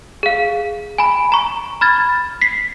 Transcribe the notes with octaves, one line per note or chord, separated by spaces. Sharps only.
G#4 F5
G#5 B5
A#5 C#6
B5 F6 G#6 A6
B6 C7